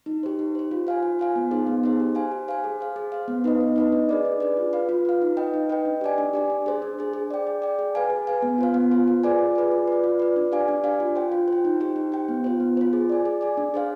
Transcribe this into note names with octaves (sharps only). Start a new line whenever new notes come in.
D#4
G4 C5
D#4
G4 C5
F4
C5 F5 G#5
F4
C5 F5 G#5
B3
D#4 G#4 C5
B3
D#4 G#4 C5
G4
C5 F5 G#5
G4
C5 F5 G#5
G#4
C5 F5
G#4
C5 F5
B3
D#4 B4 D#5
B3
D#4 B4 D#5
D4
G#4 B4 D5
D4
G#4 B4 D5
F4
B4 F5
F4
B4 F5
D#4
B4 D#5 G5
D#4
B4 D#5 G5
D4
G4 D5 G#5
D4
G4 D5 G#5
D4
G#4 C5
D4
G#4 C5
G#4
D5 G5
G#4
D5 G5
G#4
B4 F5 G#5
G#4
B4 F5 G#5
B3
F4 C5 F5
B3
F4 C5 F5
F4
G#4 B4 D5 G#5
F4
G#4 B4 D5 G#5
F4
B4 D5
F4
B4 D5
D4
G4 D5 F5 G#5
D4
G4 D5 F5 G#5
F4
C5 G5
F4
C5 G5
D#4
G4 C5 G5
D#4
G4 C5 G5
B3
F4 C5
B3
F4 C5
G#4
D5 G#5
G#4
D5 G#5
D4
G#4 C5 F5